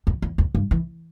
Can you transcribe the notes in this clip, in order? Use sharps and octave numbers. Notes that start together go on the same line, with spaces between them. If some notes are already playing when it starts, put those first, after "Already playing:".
E2
E2
E2
G2
E3